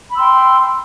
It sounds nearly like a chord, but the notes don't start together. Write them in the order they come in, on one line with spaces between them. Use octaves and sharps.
B5 E6 C6 G5